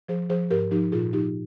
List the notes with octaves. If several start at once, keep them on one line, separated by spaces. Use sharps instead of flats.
F3 G#4 C5
F3 G#4 C5
G#2 G4 A#4
F3 D#4 G4
A#2 F4 G#4
F3 D#4 G4